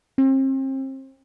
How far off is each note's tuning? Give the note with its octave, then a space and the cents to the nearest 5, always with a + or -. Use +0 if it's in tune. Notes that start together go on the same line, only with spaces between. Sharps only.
C4 +35